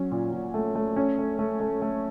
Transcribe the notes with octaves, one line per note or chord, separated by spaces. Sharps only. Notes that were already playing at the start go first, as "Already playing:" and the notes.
Already playing: F#3 C#4
A#2
A#2
A3
A3
C#4
A3
A3
A3
A3